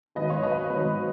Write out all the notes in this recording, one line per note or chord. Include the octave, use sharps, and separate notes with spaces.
G#2 D#3 F#3 B4 D#5
C#5 F5
B4 D#5
G#2 D#3 F#3 B4